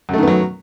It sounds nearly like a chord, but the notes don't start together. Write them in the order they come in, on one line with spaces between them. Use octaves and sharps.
F#2 A3 D#3 B3 F#3